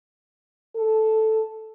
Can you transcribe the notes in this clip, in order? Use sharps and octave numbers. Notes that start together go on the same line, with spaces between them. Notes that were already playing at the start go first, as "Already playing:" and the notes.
A4